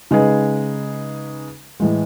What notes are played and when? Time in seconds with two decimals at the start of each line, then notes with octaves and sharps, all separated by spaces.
0.11 C#3 G#3 D#4 G#4 B4
1.80 A2 E3 G#3